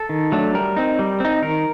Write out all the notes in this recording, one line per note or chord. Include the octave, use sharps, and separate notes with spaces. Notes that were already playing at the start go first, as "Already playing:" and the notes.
Already playing: A4
D#3
F#3 A3 D4
G3 A#4
C4 D#4
G3
C4 D#4
D#3 A#4